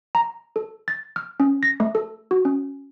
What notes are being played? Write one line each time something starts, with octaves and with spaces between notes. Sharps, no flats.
A#5
A4
A6
F6
C#4
A#6
A3
A4
F#4
C#4